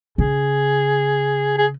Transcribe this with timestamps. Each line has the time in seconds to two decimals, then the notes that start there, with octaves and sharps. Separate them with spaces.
0.18 C#3 G#4
1.58 G#4